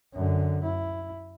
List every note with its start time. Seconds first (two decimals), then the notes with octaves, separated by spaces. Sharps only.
0.14 F#2 D3
0.63 E4